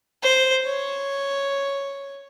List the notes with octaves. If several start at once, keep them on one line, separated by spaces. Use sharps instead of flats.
C5
C#5